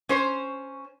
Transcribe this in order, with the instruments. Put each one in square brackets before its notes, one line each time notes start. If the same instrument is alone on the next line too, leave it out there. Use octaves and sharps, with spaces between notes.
[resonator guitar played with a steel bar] C#4 C5